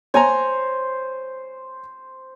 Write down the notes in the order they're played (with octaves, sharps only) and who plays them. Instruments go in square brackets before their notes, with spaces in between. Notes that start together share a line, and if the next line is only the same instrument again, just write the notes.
[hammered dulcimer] C5 [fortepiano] C#5 G#5 A#5